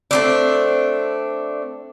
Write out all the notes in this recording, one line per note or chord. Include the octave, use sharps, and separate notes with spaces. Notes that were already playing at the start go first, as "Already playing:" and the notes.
A3 C4 D4